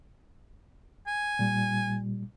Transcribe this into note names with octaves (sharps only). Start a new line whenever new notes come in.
G#5
A#2 G3